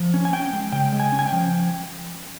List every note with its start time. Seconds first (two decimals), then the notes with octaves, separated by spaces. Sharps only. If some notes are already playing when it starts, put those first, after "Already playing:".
Already playing: F3
0.14 C#4
0.25 G#5
0.33 C#4 G5
0.53 G#3
0.72 C#3 G5
0.93 G#3
1.00 G#5
1.12 C#4
1.19 G#5
1.26 G5
1.32 F3